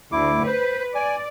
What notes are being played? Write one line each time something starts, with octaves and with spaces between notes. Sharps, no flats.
D2 E4 D6
B4 C5
D5 G#5